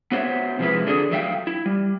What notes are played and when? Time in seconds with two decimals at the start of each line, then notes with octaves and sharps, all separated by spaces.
0.12 B3 F#4 C5 C#5 D#5 E5
0.59 C3 F3 G#3 C4 E4 B4
0.86 D3 D4 F#4 G#4 A4
1.11 E2 F#3 A3 E5 F5 G5
1.47 E4
1.66 G3